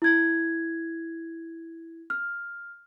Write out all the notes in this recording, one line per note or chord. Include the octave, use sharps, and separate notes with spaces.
E4 G#6
F6